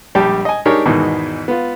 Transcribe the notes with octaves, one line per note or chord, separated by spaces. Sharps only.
A#1 G3 G4 G5 A5
D#5 G#5
D4 D#4 G4 G#4 A#4 C#5
E2 G#2 B2 D#3 E3
B3 F4